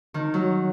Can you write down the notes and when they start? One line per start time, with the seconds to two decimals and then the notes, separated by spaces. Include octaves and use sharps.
0.14 D#3
0.34 F#3